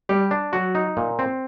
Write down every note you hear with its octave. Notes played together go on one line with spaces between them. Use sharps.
G3 G4
D4
F#3 F#4
D#4
A#2
C4